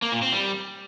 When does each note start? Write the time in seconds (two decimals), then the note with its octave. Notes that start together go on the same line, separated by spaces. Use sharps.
0.02 A#3
0.12 A#2
0.22 C4
0.32 G3